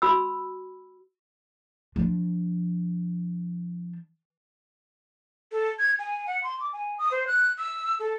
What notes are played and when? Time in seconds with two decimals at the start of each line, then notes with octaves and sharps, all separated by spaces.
0.02 F#4 B5 E6
1.96 F3 D4
5.52 A4
5.79 G#6
5.99 G#5
6.27 F#5
6.43 C6
6.60 D6
6.73 G#5
6.99 D#6
7.11 C5
7.27 F#6
7.58 E6
7.99 A4